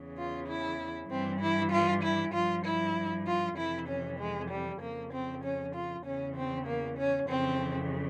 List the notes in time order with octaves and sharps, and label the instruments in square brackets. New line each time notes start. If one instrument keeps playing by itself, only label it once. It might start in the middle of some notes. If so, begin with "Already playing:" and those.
Already playing: [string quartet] E2 C#3 E3
F4
E4
G2 E3 C4
E4
F4
E4
G2 F3 F4
E4
F4
F2 C3 E3 E4
C#4
G#3
G3
F2 C#3 F3 A#3
C4
C#4
F4
E2 C#3 E3 C#4
C4
A#3
C#4
F2 C#3 E3 C4